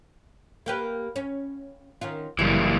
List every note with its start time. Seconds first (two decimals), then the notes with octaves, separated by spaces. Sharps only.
0.66 A#3 G4 B4
1.16 C#4
2.01 D#3 C#4 F4
2.39 F#1 C3 E3 G3 A#3